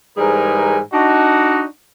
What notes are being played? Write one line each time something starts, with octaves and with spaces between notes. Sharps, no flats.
G#2 E3 G3 G#4 A#4 G#5
D4 D#4 F#4